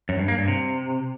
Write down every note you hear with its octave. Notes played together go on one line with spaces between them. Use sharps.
F#2
G2
A#3
G2
C3